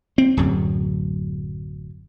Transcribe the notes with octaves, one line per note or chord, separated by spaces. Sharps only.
C4
D1 F#2